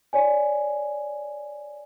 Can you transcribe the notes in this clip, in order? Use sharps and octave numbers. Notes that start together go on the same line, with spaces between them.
C#5 D5 G#5